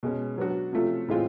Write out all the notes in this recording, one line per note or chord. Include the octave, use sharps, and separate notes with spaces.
B2 G#3 C#4
F#3 B3 D4 F#4
C3 F3 A3 C#4 F4
A2 E3 G#3 C4 F4